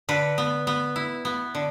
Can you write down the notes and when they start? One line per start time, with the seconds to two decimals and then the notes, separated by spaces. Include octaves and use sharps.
0.09 D3 B4
0.38 B3
0.67 B3
0.96 E4
1.25 B3
1.55 D3